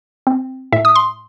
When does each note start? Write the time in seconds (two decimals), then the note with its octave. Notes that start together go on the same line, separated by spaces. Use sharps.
0.27 C4
0.72 A2 E5
0.85 D#6
0.95 C6